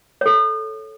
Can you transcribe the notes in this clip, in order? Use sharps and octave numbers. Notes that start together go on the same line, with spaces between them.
A4 C#5